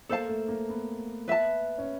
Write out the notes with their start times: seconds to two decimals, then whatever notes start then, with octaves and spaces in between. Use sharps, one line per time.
0.09 A#3 A4 C5 F5 A5
0.28 A3
0.48 A#3
0.69 B3
1.28 B4 E5 A5
1.78 C#4